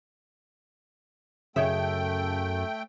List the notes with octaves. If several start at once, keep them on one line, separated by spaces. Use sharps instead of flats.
F#2 C#3 A3 C#5 D#5 E5 G5